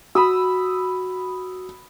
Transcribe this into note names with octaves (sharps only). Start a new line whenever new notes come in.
F#4 B5 D#6 E6